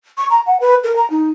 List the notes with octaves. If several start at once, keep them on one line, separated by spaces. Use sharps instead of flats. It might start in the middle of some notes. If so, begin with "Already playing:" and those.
C#6
A#5
F#5
B4
A#4
A#5
D#4